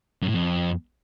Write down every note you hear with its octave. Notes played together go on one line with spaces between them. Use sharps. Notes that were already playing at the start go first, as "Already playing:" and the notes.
F#2
A2
F2